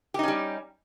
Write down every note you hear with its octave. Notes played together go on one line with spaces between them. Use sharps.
G3 C#4 D#4 G4